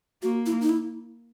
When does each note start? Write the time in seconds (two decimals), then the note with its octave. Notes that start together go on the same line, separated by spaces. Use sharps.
0.23 A#3 F#4
0.46 E4
0.61 D#4
0.69 E4